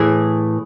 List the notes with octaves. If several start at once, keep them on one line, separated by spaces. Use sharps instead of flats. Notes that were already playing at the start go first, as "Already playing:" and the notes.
Already playing: A2 E3 G#4